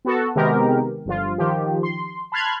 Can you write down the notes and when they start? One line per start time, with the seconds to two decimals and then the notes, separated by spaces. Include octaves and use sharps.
0.05 B3 F#4 A4
0.35 C3 D#3 G#3 B3 G4 A#4
1.06 G1 F3 F4
1.38 D#3 F3 G4
1.83 C6
2.32 A5 B5 C6 F6 F#6 G#6